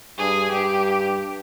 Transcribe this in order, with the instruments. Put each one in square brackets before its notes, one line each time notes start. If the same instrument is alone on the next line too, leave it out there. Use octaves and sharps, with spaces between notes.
[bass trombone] G2 [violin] G#4
[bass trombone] G2 [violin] G4